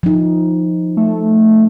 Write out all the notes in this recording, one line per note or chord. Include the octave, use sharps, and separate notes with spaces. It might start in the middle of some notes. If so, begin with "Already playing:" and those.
F3 D#4
A3